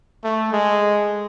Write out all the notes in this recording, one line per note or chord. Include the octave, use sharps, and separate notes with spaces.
A3
G#3